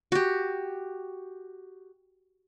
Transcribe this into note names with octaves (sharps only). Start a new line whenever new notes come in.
F#4 G4